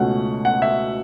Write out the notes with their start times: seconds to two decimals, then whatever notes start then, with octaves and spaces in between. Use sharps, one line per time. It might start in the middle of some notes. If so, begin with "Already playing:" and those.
Already playing: C#2 B2 A3 C#4 F#5
0.45 F#5
0.62 E5